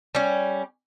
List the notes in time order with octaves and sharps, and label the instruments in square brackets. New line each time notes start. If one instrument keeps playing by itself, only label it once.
[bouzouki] G3 C#4